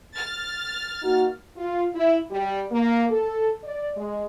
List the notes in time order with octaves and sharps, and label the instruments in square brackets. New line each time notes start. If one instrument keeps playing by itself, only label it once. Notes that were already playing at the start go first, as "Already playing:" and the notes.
[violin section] F6 A6
[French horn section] A#3 D#4 F#4
F4
E4
G3
A#3
A4
D5
G#3